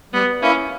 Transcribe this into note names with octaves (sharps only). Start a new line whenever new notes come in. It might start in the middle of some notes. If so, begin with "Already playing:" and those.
G3 B3
A#3 C#4 E4